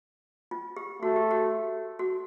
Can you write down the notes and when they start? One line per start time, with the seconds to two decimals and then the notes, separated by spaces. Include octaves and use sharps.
0.51 F4
0.77 G4
1.02 A3 F#4
1.16 G4
1.31 F#4
1.99 F#4